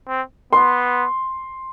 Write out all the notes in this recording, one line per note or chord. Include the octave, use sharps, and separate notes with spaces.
C4
B3 C6